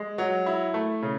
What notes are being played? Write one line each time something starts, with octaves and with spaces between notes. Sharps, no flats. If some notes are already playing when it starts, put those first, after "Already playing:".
Already playing: G#3
F#3
E4
A3
C#3